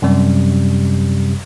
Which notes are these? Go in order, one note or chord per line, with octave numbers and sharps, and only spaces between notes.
F#2 C3 G3